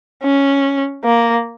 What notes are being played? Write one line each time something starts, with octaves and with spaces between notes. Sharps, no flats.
C#4
A#3